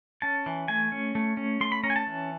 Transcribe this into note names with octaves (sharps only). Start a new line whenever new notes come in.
C#4 A5
E3
A3 G#5
C#4
A3
C#4
A3 C6
B5
C#4 A#5
G#5
A5
E3